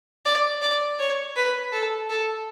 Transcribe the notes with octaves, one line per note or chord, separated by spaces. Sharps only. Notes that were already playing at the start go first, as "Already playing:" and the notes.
D5
D5
C#5
B4
A4
A4